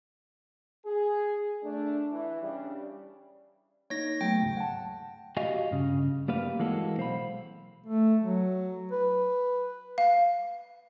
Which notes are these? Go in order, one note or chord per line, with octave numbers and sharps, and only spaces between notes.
G#4
A3 D4
E3
C#3 G3 D4
A#3 D#4 C#5 A#6
F#3 A3 B3 G5
D#2 G#2 C#3
F#5 A5
F#4 G4 D#5 F5 G#5
G2 C#3
G3 A#3 B4 F5
E3 G#3 A#3 C4 F#4 A4
B1 C5 F5 B5
A3
F#3
B4
F5